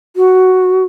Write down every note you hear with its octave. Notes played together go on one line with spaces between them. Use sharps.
F#4